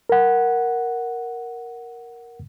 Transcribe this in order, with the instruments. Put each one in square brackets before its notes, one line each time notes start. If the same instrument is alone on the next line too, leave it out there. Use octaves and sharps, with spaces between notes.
[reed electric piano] A#4 F#5